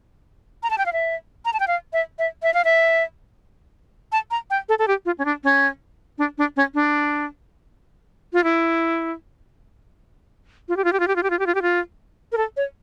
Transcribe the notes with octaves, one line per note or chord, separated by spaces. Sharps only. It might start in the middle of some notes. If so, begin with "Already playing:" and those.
A#5
A5
G5
F5
E5
A#5
A5
G5
F5
E5
E5
E5
F5
E5
A5
A#5
G5
A4
A4
G4
F4
C#4
D4
C#4
D4
D4
C#4
D4
F4
E4
F4
G4
F4
G4
F4
G4
F4
G4
F4
G4
F4
G4
F4
A#4
A4
C#5